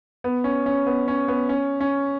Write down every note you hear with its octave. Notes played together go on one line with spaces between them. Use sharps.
B3
C#4
C#4
B3
C#4
B3
C#4
C#4